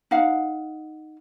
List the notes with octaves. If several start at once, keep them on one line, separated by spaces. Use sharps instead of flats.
D#4 F5 F#5